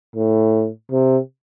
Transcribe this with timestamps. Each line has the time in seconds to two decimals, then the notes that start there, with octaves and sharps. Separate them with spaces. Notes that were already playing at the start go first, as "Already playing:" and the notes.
0.16 A2
0.92 C3